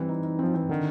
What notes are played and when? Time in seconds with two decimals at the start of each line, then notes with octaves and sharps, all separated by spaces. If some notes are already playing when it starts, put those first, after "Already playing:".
Already playing: E3 G3 C4
0.09 D#4
0.24 D#4
0.39 F3 C4
0.54 E3 C4
0.69 D3 D#3